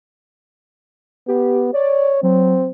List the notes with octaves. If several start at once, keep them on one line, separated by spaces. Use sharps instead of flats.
B3 G4
C#5 D5
F#3 C4